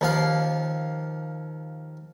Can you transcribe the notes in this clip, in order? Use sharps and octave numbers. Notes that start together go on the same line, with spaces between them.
D#2 F3 F5